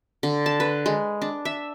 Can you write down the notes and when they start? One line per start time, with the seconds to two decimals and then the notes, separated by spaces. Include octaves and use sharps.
0.23 D3
0.46 A5
0.60 B4
0.86 G#3
1.22 D4
1.45 E5